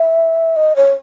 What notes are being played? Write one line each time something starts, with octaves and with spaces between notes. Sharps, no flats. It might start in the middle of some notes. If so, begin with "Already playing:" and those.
Already playing: E5
D#5
C#5